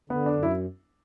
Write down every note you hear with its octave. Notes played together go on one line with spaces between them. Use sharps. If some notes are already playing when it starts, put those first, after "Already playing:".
D3 B3
D4
F#2
E4